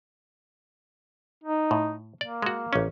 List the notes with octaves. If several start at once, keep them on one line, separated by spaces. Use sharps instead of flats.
D#4
A2
A#3 D5
G#3 F#4
A1 C#4